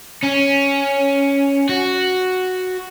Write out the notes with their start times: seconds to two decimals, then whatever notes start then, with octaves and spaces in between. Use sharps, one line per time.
0.23 C#4
1.69 F#4